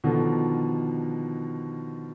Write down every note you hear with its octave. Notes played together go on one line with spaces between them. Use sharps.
B2 D3 D#3 F3